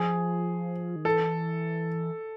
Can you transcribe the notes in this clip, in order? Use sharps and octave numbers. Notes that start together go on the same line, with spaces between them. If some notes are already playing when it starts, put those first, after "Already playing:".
Already playing: F3 G#4
D#3
E3 A4